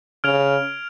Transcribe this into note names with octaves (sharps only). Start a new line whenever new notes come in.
C#3 F6 G#6 D7 F7